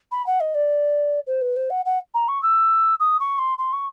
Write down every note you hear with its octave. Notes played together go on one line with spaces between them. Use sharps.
B5
F#5
D#5
D5
C5
B4
C5
F#5
F#5
A#5
C#6
E6
D#6
C#6
C6
C6
C#6